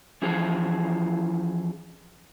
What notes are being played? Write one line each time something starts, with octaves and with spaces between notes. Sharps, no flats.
E3 F3 C#4 E4 G#4 C5